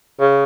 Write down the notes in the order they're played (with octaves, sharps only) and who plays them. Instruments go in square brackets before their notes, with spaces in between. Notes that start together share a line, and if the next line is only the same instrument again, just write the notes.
[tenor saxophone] C#3